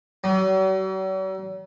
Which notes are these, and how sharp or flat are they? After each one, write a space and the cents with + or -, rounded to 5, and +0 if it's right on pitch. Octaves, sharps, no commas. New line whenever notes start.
F#3 +45